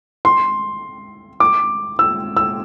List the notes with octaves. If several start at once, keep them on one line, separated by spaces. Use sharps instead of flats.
C6
D6
E6
E6